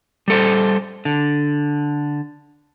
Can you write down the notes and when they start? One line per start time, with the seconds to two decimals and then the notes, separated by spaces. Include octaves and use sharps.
0.28 G3 A4 C5
1.05 D3